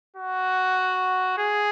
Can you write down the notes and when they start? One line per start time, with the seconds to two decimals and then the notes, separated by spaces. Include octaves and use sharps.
0.17 F#4
1.38 G#4